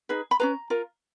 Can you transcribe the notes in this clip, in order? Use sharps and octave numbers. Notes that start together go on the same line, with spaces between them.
D#4 G#4 B4
B5
C#4 G#4 B4 A#5
F4 A#4